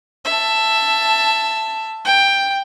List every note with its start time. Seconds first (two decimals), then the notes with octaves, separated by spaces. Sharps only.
0.25 E5 A5
2.05 G5